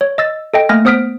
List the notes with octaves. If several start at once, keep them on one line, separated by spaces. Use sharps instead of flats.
C#5
D#5 E6 A6
A4 D#5 G5
A3 A#3 G#5 F6 A#6
B3 C5 D#6 F6 B6 D7